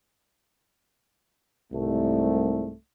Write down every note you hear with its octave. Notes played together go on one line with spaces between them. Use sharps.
C2 G#2 A3